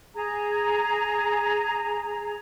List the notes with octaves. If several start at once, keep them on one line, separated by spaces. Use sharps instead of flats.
G#4 A#5